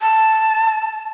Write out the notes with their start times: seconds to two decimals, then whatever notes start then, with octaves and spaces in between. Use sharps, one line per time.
0.01 A5